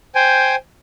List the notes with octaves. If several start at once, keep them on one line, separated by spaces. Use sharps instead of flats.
C5 G5 G#5